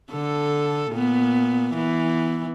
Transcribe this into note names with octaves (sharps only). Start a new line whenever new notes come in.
D3 A4
A#2 B3
E3 B3